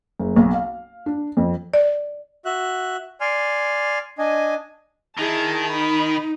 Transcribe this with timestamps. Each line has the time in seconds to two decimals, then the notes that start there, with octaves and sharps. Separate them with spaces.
0.20 F#1
0.36 B1
0.53 F5
1.06 D4
1.37 F2
1.74 D5
2.45 F#4 E5 F#6
3.21 D5 G#5 C6 F6
4.18 D4 D#5 G#5
5.18 D#3 E4 G#4 A5
5.72 D#4 B5